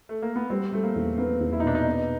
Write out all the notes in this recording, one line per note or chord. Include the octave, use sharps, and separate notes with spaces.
A3
A#3
B3
G3 C4
G3 A3
A#3
E2
A#3 B3
E2
E4
D#4
B2 D4
D#4
B3